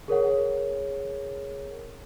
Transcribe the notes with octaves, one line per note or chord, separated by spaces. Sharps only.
G#4 A#4 C#5 F#5